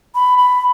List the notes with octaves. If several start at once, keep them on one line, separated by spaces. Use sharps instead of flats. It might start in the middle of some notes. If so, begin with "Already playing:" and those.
B5
B5